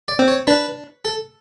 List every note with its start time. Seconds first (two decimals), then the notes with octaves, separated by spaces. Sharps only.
0.08 D5
0.19 C4
0.28 C#5
0.47 D4 B4
1.05 A4